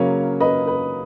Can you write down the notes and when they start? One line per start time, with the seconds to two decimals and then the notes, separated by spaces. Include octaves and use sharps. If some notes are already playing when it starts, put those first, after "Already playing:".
Already playing: C#3 F#3 A#3 C#4 C#5 F5
0.40 B4 D#5
0.67 B4